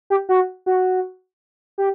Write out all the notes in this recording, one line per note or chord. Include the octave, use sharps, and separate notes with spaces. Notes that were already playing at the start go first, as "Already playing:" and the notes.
G4
F#4
F#4
G4